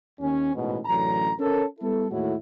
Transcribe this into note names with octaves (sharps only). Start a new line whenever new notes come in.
D#2 C#4
A1 G#2 B2
A1 F#2 D3 A#5
C#4 A4 A#4
G3 B3 E4 A4
D#2 A2 G#3 E4 F#4 A4